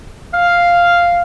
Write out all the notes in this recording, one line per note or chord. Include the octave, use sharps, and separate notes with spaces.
F5